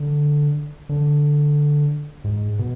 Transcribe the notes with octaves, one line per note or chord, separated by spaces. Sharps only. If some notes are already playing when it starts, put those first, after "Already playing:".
Already playing: D3
D3
G#2
B2